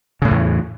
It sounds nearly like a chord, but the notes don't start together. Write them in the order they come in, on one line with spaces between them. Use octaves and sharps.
C#3 A2 E3 E2